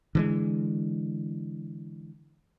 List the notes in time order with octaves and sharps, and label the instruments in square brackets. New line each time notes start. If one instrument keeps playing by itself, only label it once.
[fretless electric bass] D3 E3 G#3